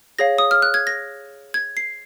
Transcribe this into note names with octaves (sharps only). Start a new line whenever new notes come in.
G#4 C#5 F5 A#6
D#6
F6
F#6
G#6
A#6
G#6
C7